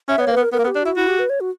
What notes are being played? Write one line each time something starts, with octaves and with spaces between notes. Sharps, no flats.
C#4 E5
B3 C#5
A#3 B4
B3
A#4
B3 A#4
A#3
B3
G4
D4
E4 F#4
E4 F#4
G4
B4
C#5
F#4